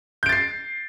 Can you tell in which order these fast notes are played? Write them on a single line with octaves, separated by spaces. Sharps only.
G6 D7 A6 C7